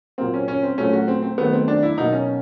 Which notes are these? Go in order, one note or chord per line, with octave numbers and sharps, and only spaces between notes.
A#2 F#3 A#3 C4
C#4
C#4
C4
A#2 F#3 A3 C#4
F#4
C4
C4
D#3 F#3 A3 B3
C4
D4
E4
B2 F#3 A#3 D#4
C#4